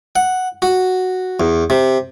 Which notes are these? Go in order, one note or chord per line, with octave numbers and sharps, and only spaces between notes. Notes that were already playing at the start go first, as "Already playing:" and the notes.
F#5
F#4
E2
C3